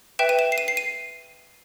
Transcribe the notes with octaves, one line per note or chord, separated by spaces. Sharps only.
B4 E5 G5 E7
D#7
E7
C7
D#7
C7
D#7